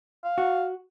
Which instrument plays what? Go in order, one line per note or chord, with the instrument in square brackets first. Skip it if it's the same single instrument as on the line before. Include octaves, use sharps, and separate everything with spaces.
[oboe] F5
[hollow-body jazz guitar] F#4